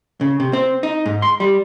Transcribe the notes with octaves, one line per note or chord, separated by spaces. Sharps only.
C#3
C3
C4
D#4
G#2
C6
G3